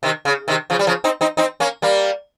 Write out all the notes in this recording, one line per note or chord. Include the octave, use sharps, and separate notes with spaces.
C3 D#3
C#3
C3 D#3
C#3 F3
G3
C#3 F3
C4 D#4
C4 D#4
C4 D#4
A#3 C#4
G3 A#3